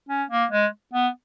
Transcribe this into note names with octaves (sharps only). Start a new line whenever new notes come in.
C#4
A#3
G#3
B3